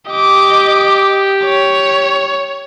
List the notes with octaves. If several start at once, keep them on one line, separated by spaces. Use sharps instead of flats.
G4 D#5 D6
C#5